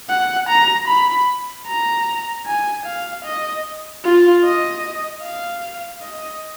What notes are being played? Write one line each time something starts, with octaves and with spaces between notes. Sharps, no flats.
F#5
A#5
B5
A#5
G#5
F5
D#5
F4
D#5
F5
D#5